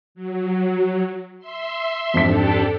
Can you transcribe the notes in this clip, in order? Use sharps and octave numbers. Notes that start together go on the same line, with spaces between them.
F#3
E5 C6
F2 G#2 D4 G4 A4 B6